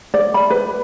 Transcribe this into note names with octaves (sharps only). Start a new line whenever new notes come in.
D5
B5
B4